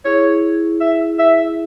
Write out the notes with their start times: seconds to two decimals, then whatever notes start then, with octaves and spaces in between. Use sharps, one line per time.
0.05 E4 G#4 C#5
0.81 E5
1.19 E5